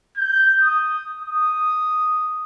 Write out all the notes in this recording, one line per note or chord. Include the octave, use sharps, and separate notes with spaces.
G6
D#6
D#6